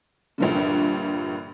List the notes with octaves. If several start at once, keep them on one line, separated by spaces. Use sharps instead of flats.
A#1 G2 D3